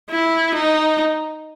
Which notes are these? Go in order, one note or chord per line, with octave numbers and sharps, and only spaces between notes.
E4
D#4